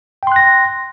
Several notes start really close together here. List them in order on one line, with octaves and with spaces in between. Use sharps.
G5 C6 F#6 A#6